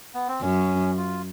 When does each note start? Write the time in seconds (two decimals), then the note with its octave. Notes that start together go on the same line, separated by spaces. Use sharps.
0.14 B3
0.28 C4
0.41 F#2 C#4
0.97 F4